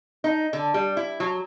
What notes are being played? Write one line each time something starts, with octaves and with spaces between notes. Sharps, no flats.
D#4
D3
G3
E4
F#3